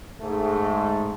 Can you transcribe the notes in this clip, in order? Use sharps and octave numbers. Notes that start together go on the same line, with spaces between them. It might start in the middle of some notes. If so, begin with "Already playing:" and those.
G#2 G#3 A3